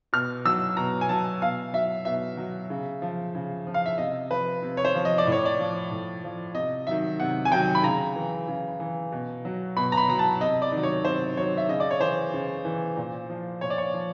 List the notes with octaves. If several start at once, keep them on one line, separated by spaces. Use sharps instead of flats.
B2 F6
F#3 E6
B2 A#5
G#5
F#3 A5
B2 F5
F#3 E5
B2 E5
F#3
C#3
F3
C#3
F3
F5
E5
C3 D#5
F3 B4
C3
C#5
C5
F3
D#5
D5
A2
C#5
D5
F3
A2
F3
C3 D#5
D#3 F#3 E5
C3 F#5
G#5
D#3 F#3 G5
B5
C#3 A#5
E3
C#3
E3
B2
F#3
B2 B5
A#5
B5
F#3 A#5
A5
C3 D#5
D5
D#3
F#3
C#5
C3 C5
D#3 F#3 C#5
E5
C#3 D#5
D5
C#5
E3 C5
C#3
E3
A#2
F3
A#2 C#5
D5
C#5
F3